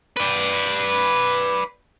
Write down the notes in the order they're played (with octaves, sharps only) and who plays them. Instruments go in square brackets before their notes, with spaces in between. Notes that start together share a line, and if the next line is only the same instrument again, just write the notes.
[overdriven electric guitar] B4 D5